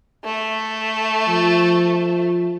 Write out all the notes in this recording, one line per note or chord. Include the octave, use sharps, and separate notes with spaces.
A3
F3